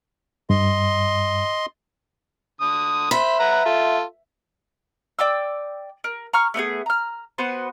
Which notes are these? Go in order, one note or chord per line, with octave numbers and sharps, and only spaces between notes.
G2 D#5 C6
D3 D#6
C5 E5 B5
B4 F#5 A#5
F4 A4
D5 G5 D6 E6
A#4
A#5 C#6 F6
A3 B3 D#4 G#4
A#5 F6
B3 F#4 B4 C5